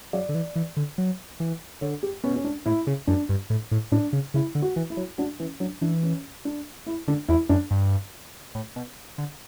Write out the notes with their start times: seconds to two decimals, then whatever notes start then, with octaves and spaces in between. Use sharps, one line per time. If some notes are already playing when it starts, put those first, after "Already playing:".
0.13 F#3 D5
0.29 D3
0.35 E3
0.56 E3
0.77 D3
0.98 F#3
1.40 E3
1.81 D3 C#5
2.03 G4
2.24 B2 C#4
2.36 C#4
2.44 D4
2.66 A2 E4
2.87 C#3
3.07 F#2 D4
3.29 G2
3.50 A2
3.71 A2
3.92 A2 D4
4.13 C#3
4.34 C#3 E4
4.55 D3
4.62 F#4
4.76 E3
4.90 E4
4.97 F#3
5.18 F#3 D4
5.39 E3 C#4
5.60 F#3 D4
5.81 E3 D4
6.03 C#4
6.45 D4
6.87 E4
7.08 D3 D4
7.28 E2 E4
7.49 F#2 D4
7.71 G2
8.55 A2
8.76 B2
9.18 D3